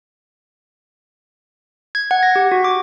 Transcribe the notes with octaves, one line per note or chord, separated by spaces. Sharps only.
G#6
F#5
A#6
G4
F#4
D6